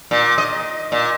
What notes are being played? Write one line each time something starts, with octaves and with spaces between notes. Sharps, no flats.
A#2
D#5
A#2